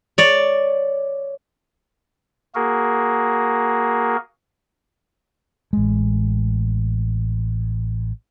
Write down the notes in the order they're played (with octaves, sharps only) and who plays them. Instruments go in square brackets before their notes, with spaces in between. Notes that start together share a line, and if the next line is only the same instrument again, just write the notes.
[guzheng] C#5 D5
[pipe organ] A#3 F#4 G#4 A#4
[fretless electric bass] A1 G#3